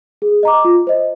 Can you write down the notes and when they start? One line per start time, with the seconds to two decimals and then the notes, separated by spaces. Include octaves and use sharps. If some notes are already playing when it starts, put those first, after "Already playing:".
0.22 G#4
0.43 D#5 A#5 D6
0.65 F4
0.87 C5 D#5